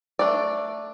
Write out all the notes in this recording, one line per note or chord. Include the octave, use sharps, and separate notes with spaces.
A3 D4 D5